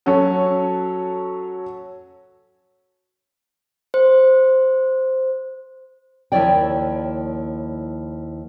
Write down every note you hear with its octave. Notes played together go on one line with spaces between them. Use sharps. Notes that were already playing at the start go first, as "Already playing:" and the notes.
F#3 C#4 F#4 A4 C#5
C5
D#2 F3 E4 C#5 D5 G5